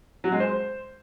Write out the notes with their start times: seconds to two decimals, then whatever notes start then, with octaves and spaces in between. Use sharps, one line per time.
0.24 F#3
0.32 G#3
0.40 C5